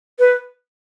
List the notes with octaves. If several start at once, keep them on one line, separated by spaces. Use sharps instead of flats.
B4